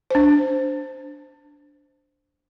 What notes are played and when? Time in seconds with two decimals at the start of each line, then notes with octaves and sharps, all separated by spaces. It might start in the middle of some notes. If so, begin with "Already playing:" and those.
0.11 D4 C5